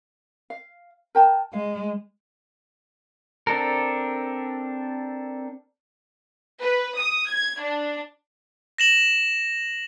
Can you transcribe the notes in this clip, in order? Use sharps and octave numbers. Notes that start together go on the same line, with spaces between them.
F5
A#4 G5 A5
G#3 F5
C4 D4 A4 A#4
B4
D#6
G#6
D4
A#6 E7 F#7